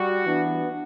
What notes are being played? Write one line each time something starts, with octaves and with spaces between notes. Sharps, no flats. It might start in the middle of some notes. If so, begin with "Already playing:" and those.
Already playing: G3 F#4
E3 B3 D4